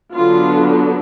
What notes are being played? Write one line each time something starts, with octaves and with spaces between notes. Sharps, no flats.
D3 F#3 B3 D4 F4